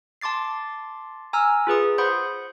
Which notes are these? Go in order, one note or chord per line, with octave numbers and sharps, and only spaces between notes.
A5 C6 D6 A6 C7
G#5 A#5 E6 F6
F4 G#4 B4 D#6
C5 F#5 B5 C6 D#6 G6